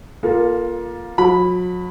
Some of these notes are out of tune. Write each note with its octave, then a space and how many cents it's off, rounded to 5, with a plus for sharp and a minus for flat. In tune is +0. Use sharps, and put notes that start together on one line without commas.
A#3 +25 F4 +0 A4 +0
F#3 -40 B5 +0